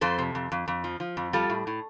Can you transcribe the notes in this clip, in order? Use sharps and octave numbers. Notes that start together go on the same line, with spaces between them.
F2 A4 C5
C3
F2
F2
F2
F3
F3
F2
G3 F4 A4
A2
A2